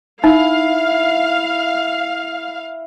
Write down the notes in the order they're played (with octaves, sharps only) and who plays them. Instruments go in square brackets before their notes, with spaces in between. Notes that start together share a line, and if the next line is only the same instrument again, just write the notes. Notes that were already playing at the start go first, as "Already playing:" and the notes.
[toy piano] D#4 [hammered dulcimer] E4 [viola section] F5